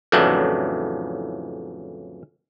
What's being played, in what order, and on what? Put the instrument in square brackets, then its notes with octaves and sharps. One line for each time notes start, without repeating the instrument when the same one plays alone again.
[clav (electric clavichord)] F2 A2 C#3 E3 F#3 D4